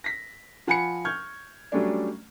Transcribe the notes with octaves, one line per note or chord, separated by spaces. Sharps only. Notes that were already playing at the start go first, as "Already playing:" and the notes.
A#6 B6
F3 F#5 G#5 B5 C#7
C#6 F6 G6 G#6
F#3 G3 A3 C#4 D4